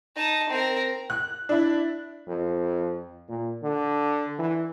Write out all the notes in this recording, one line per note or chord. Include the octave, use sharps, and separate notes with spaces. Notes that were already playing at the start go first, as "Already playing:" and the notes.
D#4 A5
C4 A#4
F#6
D4 E4
F2
A#2
D3
E3